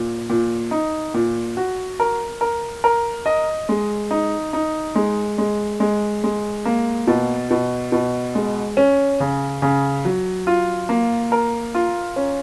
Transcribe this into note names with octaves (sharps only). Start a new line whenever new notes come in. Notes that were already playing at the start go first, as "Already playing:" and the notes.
Already playing: A#2
A#2
D#4
A#2
F#4
A#4
A#4
A#4
D#5
G#3
D#4
D#4
G#3
G#3
G#3
G#3
A#3
B2
B2
B2
G#3
C#4
C#3
C#3
F#3
F4
A#3
A#4
F4
C#4